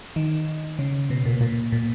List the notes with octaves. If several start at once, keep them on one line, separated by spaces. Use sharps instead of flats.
D#3
C#3
B2
A#2
A#2
A#2